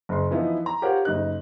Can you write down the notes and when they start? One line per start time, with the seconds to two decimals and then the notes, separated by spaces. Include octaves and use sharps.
0.09 F#1 C6
0.31 E3 F3 B3 D#4 E4
0.66 A#5
0.82 F4 G4 A#4 C5 C#5 F#5
1.05 F#1 D#4 F#6